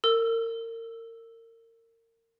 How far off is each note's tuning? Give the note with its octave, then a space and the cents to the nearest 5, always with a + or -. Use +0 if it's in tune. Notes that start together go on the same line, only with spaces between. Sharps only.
A#4 -30 E6 +0